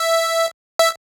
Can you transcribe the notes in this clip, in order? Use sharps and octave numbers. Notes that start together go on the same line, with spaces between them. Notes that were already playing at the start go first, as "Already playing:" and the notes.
Already playing: E5
E5